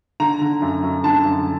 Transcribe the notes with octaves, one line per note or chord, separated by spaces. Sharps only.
D3 A#5
D3
F#2
F#2
D3 A5
F#2